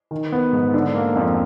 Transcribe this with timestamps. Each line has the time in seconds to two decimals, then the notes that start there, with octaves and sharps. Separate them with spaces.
0.11 D#3
0.32 B3
0.53 G#2
0.74 D3
0.95 A#3
1.16 F2